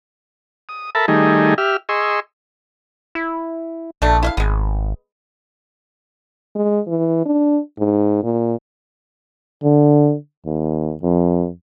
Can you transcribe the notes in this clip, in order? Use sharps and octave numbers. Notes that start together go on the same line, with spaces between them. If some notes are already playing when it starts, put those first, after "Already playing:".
D#6
A4 A#4 E5 A5 B5
D#3 G3 A3 D#4 G#4
G4 E5 F6
G#4 D#5 C6 C#6 E6
E4
A#1 A3 D4
E4 E5 F5
G#1 G#3 B3
G#3
E3
D4
G#2
A#2
D3
D#2
F2